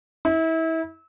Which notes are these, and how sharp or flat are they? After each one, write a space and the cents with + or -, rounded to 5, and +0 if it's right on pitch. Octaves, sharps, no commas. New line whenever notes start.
E4 -30